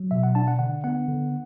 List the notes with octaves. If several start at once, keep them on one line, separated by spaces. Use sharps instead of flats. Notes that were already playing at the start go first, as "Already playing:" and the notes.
Already playing: F#3
B2 E5
F#5
D4 A5
F#5
D3 F#5
B3 F#5
D3